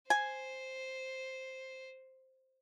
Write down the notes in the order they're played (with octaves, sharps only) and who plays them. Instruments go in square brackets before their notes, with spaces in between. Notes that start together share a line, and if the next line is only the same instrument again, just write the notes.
[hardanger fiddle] C5 [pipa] G#5